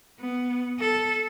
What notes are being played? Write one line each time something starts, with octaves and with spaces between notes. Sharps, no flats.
B3
A4